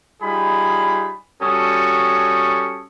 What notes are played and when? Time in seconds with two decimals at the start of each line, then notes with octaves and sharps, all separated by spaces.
0.22 G3 D#4 F4 G#4 B5
1.42 G3 C#4 F#4 A4 C#6 D#6